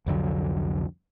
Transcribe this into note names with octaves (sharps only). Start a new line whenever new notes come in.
C2 F2 D3 F#3